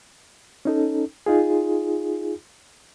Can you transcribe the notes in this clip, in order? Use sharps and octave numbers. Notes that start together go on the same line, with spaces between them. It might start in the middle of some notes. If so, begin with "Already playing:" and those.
C#4 D#4 A4
D#4 F4 G#4